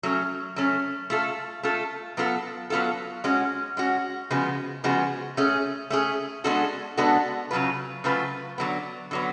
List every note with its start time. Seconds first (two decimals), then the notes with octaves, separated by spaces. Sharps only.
0.03 F#3 A3 C#4
0.56 F#3 A3 C#4
1.10 A3 F4 A4
1.63 A3 F4 A4
2.17 F#3 B3 F4 A4
2.70 F#3 B3 F4 A4
3.24 G#3 C#4 F#4
3.77 G#3 C#4 F#4
4.30 C#3 F3 G#3 B3 F#4
4.84 C#3 F3 G#3 B3 F#4
5.37 A3 C#4 G#4
5.90 A3 C#4 G#4
6.44 G#3 B3 D4 F#4 A4
6.97 G#3 B3 D4 F#4 A4
7.51 C#3 F#3 A3 F4 B4
8.04 C#3 F#3 A3 F4 B4
8.58 D3 F#3 B3
9.11 D3 F#3 B3